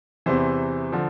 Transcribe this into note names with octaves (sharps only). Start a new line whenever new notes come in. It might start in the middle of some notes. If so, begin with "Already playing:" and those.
E2 C3 E3 C5
D3 F3